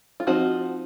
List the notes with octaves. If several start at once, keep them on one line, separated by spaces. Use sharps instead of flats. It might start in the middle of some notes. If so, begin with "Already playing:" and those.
F4
F3 C4 D#4 F#4